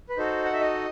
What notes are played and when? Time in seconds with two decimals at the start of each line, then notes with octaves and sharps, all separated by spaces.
0.09 B4
0.17 D#4 F#4 A4 C5
0.45 F#5
0.53 E5
0.60 D#5